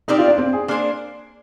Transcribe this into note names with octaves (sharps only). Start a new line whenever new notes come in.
C4 D#4 G4 A#4 D5
F4
D4
C4
G#4
A#3 D4 G#4 C5